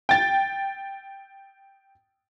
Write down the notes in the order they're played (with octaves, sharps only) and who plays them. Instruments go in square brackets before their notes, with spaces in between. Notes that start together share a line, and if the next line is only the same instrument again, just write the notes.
[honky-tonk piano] G5 A6